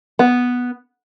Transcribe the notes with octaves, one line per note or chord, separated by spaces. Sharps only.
B3